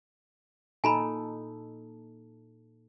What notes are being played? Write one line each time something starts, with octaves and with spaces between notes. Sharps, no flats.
A#2 D#4 A4 G#5 A#5 B5